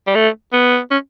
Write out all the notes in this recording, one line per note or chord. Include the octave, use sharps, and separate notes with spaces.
G3
A3
B3
C#4